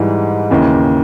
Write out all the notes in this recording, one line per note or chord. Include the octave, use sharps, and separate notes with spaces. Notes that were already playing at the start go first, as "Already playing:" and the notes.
Already playing: G#2 E3 G3
D#2 C#3 E3